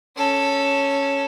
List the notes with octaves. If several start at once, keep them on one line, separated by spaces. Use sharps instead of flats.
C#4 A4